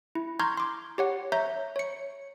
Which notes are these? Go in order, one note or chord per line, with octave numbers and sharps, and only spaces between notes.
E4
A#5 C6 C#6 F6 G6 G#6
C6 D6
G4 C#5 F#5
C#5 E5 A#5 G6
C#5 C#7